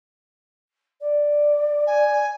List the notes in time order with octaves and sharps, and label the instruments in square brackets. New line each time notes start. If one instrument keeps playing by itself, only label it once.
[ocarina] D5
[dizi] G#5